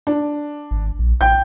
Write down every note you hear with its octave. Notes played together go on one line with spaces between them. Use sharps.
D4
G#1
A#1
A1 G5 G6